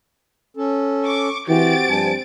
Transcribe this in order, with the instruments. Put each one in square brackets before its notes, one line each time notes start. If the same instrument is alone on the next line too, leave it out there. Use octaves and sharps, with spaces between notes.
[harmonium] C#4 A4
[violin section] C#6 D6
[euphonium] E3 [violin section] C4 A6 D7 [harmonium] F#4 G4
[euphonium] G2 [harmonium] F3 G#5 A5